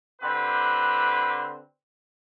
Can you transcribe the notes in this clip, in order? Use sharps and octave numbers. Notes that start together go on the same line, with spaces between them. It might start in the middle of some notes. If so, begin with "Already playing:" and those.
D3 C4 G4 B4